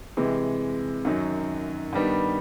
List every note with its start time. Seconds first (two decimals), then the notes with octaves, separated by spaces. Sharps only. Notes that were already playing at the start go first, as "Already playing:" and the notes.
0.17 C3 E3 G#3
1.05 F#2 D#3 F#3
1.93 G2 D#3 G3 B3